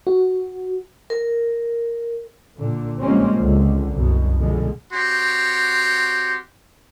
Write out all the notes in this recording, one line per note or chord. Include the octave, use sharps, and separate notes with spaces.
F#4
A#4
A#2 D3
F3 G3 G#3 A#3 C4 C#4
C#2 D3
C2 F#2 B2
E2 B2 D3 F3 G#3
C4 F#4 G4 C#5 C6